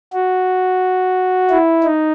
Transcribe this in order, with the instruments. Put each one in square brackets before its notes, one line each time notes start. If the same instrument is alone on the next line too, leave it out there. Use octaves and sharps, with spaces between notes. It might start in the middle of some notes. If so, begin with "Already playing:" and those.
[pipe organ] F#4
E4
D#4